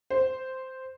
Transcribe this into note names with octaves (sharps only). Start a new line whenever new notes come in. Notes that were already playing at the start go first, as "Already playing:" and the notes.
C5